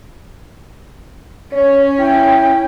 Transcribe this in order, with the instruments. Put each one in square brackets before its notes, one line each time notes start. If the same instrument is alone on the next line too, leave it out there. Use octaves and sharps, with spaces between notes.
[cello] C#4 [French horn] C#5
[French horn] E4 [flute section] G5